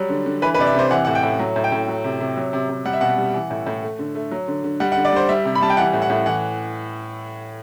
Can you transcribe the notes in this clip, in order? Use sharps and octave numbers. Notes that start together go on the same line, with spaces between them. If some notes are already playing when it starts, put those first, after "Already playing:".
Already playing: F#3 G3
D3
D3
E3 B4
B4
C3 D5
E5
C3 C5
E3 F#5
A2 F#5
G5
A2
F#3
A2
G5
A2
F#3
C3
C3
F#3
C3
C3
G3 F#5
E5
B2 F#5
G3
E3
A2
A2
A3
D3
A3
F#3
D3
D3
G3 F#5
F#5
D3
D5
G3 C5
G3 E5
C3
B5
G3 A5
G5
E3 F#5
A2
F#5
A2
E3 F#5